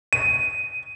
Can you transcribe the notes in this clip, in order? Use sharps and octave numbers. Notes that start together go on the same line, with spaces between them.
D#7